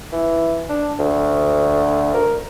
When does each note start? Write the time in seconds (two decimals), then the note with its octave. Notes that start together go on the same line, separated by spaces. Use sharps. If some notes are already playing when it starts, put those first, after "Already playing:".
0.12 E3
0.69 D4
0.99 D2
2.15 A#4